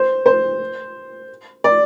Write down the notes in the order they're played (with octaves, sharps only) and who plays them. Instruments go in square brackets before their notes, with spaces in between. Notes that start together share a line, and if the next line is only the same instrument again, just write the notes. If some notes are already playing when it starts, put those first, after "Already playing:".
Already playing: [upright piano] C5
C5
D5